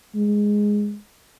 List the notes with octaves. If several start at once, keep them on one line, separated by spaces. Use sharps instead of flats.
G#3